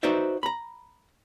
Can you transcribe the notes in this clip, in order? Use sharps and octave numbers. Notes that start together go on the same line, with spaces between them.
D#4 F#4 B4 C5 D5 E5
A#5 B5